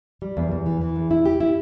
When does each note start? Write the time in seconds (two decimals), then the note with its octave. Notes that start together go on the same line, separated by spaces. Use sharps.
0.22 G3
0.37 E2
0.52 E2
0.66 E3
0.81 E3
0.96 E2
1.11 E4
1.25 G4
1.40 E4